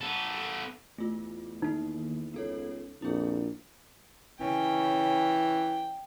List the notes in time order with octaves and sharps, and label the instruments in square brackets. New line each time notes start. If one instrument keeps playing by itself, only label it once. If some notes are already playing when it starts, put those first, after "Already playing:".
[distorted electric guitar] B3 A4
[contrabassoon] E2 [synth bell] A3 F4
[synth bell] D#3 A#3 [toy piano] D#4
[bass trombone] C#2 [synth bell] B3 A4 C#5
[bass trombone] A#1 [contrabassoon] F2 [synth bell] E4 G#4
[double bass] C#3 C#4 [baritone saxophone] E3 [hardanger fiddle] G5